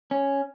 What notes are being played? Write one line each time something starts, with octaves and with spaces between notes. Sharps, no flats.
C#4